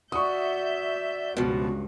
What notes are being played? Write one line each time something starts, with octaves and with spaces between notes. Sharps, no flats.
F#4 D5 E5 C#6 D#6 G6
C#2 G2 B2 F3 F#4